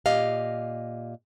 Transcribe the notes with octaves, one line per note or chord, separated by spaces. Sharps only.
A#2 G4 D#5 F5